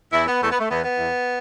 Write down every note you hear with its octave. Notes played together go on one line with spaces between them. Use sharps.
E2 E3 E4
B3
E2 E3 A3
B3
A3
E2 E3 B3
B3
E2 E3